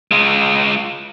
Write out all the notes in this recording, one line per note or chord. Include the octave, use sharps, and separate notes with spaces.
G#3 F4